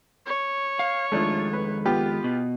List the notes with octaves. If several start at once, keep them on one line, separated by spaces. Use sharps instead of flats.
C#5
F5
F2 D#3 G#3 A3 D4 F4
B4
B3 F4 G4
B2